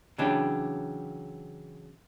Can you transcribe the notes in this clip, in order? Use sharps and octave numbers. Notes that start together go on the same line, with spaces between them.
C#3 E3 F#3 D4 E4 G4